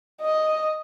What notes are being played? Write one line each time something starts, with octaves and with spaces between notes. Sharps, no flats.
D#5